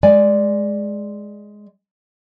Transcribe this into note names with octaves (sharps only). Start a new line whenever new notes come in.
G#3 D5 G#5